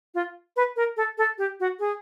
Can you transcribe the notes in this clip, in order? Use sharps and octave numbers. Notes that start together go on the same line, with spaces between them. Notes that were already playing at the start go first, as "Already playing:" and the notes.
F4
B4
A#4
A4
A4
G4
F#4
G#4